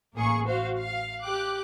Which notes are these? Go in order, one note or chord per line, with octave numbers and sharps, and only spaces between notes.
A1 A#3 G#4 C#6
F#4 C5 F5
F5
G4 G5 D6 F#6